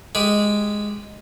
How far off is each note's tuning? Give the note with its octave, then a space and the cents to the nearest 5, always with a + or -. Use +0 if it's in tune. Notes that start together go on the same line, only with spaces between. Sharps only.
G#3 +0 G4 +0